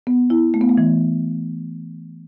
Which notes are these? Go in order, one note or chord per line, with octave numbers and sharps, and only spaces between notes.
B3
E4
A3
B3
A3
E3